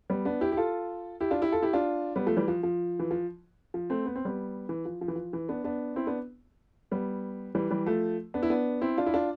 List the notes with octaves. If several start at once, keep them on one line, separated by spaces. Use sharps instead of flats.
G3 B3
B3 D4
E4 G4
G4
F4 A4
E4 G4
D4 F4
E4 G4
F4 A4
E4 G4
D4 F4
G3 B3
F3 A3
E3 G3
F3
F3
E3
F3
F3
A3 C4
B3
C4
G3 B3
E3
F3
F3
E3
F3
E3
B3 D4
B3 D4
C4 E4
B3 D4
G3 B3
E3 G3
E3 G3
F3 A3
B3 D4
E4
B3 D4
C4 E4
D4 F4
E4
D4 F4